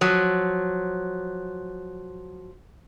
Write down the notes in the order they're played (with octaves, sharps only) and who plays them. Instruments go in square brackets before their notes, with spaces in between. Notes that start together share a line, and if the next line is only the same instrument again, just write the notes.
[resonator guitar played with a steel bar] F3 F#3